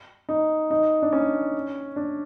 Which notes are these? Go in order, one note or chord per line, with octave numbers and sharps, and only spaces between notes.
D#4
D#4
D4
C#4
D4